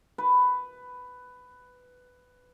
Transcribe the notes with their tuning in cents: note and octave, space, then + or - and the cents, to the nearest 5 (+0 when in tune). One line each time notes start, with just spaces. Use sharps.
B4 +10